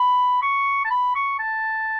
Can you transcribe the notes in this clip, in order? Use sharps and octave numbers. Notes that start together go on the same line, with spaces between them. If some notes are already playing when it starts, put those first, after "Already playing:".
Already playing: B5
C#6
A5
B5
C#6
A5